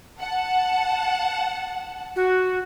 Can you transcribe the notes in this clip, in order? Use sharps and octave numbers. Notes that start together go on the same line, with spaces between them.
F#5 A5
F#4